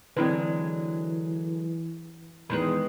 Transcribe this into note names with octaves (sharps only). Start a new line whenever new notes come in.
D3 E3 F#3 G#3 C4 E4 B4
E2 D#3 G#3 B4 B5 G6